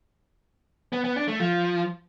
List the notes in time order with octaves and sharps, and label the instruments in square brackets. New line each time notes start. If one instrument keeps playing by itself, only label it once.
[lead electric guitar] B3
B3
D4
A3
F3